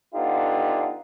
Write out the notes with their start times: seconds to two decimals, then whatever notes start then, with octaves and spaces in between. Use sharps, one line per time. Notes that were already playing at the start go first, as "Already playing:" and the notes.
0.15 D3 B3 D#4 F4 G4